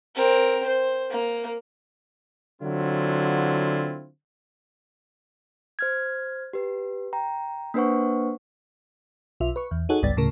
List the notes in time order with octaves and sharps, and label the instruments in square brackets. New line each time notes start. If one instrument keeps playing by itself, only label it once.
[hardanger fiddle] C4 A#4
C5
A#3
[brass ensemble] D3 F#3 C4 E4 F4
[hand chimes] C5 F6 G#6
G4 B4
G5 A#5
A#3 D4 B4 C5 F#5 C#6
[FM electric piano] B1 F4 E5
B4 C#6
E2
D#4 F#4 G#4 A4 C#5 F#5
G#1 C#2 G2 B3 D5 A6
D2 A2 C#3 A#4